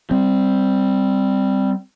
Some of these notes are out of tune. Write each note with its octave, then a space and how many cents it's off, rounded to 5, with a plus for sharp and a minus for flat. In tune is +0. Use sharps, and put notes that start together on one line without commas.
G3 +0 C4 +0